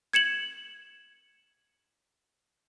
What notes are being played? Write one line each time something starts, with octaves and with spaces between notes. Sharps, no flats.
G#6 C#7 E7 F#7